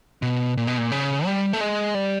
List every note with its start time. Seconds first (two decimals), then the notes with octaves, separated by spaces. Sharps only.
0.22 B2
0.57 A#2
0.67 B2
0.78 A#2
0.92 C#3
1.26 G3
1.53 A3
1.61 G#3
1.95 G3